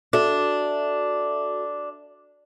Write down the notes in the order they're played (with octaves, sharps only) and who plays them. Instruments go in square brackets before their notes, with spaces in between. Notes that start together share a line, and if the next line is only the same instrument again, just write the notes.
[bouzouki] D4 [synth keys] F#4 A4 E5